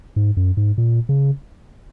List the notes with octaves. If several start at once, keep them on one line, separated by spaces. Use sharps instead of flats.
G#2
F#2
G#2
A#2
C#3